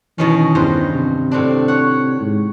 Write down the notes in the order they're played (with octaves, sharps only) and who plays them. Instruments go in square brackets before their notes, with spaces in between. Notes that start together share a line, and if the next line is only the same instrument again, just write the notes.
[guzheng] B2 D#3 C#4 [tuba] E3
[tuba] E2 [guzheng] G2 C5
[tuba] C3
[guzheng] A2 C4 D4
C#5 F#5
[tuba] G#2